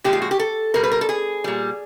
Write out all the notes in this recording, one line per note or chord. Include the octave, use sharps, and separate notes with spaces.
A#2 F3 G#3 G4
F4
F#4
G4
A4
B2 G3 A#4
B4
A#4
A4
G#4
A#2 G3